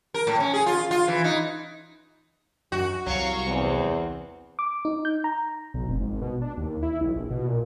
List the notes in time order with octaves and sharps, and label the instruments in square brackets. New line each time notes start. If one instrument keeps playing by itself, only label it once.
[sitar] A#4
A2
C#4
G#4
F4
F4
E3
D#4
[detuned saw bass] F#2 [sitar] F#4
[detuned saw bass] C2 [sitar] F#3 [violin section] F5 C#6
[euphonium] E2 [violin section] C4
[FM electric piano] D6
D#4
G6
A#5
[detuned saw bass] B1
F1
G#1
B2
D4
D#2
E4
B1
A#1
B2
A#2